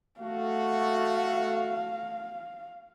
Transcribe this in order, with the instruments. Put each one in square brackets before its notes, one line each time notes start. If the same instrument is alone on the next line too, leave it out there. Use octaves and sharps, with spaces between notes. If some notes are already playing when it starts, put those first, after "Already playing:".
[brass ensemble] A3 F#4 [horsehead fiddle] F5